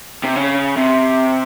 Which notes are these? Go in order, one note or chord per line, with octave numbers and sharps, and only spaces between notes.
C3
C#3
C3